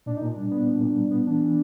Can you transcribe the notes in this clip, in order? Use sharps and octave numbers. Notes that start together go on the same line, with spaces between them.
A#2 D4
A#2 D#4
D4
G3
B3
A#2
A#2
G3
B3
E3 D4
E3